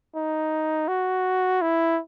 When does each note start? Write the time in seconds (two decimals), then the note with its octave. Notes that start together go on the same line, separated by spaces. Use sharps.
0.15 D#4
0.88 F#4
1.62 E4